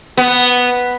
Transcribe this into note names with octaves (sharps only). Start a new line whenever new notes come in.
B3